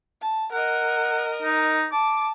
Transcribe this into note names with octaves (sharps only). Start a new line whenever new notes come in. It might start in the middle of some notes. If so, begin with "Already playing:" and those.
A5
A#4 D#5 F#5
D#4
A5 D6